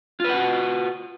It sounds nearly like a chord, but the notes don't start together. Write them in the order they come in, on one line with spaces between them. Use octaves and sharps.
F4 B4 F#5 F#4